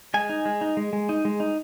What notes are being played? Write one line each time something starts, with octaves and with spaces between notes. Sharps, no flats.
G#3 G#5
D#4
G#3
D#4
G#3
G#3
D#4
G#3
D#4